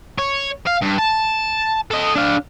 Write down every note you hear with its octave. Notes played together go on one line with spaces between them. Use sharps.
C#5
F5
G2
A5
A4 D#5
D4 F5